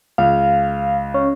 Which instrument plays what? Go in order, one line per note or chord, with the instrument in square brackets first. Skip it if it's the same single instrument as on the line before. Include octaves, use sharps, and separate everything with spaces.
[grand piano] C#2 [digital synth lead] F5
[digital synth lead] C#4